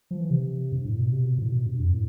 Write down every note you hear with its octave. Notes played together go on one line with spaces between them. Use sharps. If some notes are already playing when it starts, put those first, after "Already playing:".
F3
E3
C3
G2
A2
B2
C3
B2
A2
B2
G2
F2
A2